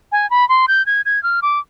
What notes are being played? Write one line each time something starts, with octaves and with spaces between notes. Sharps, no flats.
G#5
B5
C6
G6
G#6
G#6
F6
D6